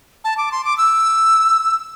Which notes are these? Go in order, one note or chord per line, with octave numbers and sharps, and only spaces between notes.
A5
D6
C6
D6
E6